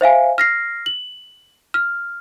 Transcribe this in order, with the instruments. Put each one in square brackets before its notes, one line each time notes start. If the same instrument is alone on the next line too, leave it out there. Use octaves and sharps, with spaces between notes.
[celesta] C5 E5 F5 G#5
F6 A#6 C7
F#7
F6